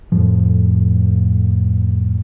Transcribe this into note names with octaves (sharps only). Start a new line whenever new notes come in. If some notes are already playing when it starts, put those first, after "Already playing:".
F2 A2 F3